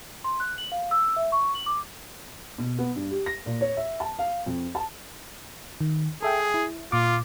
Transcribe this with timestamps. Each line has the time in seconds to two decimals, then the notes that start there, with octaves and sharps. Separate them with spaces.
0.24 C6
0.40 F#6
0.58 F#7
0.72 F5
0.91 E6
1.16 E5
1.32 C#6
1.55 F#7
1.66 D6
2.58 B2
2.79 B3
2.95 G2
3.11 G4
3.26 A#6
3.46 A#2
3.61 C#5
3.77 E5
4.00 A5
4.19 F5
4.46 F2
4.75 A5
5.81 D#3
6.23 G#4 A4 E5 G5
6.54 E4
6.92 A#2 F4 D6